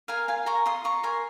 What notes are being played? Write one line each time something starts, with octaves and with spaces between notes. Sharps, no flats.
A#4 F5 G#5
F4 F5 G#5
A#4 A#5 C#6
F4 C6 D#6
F4 A#5 C#6
A#4 G#5 C6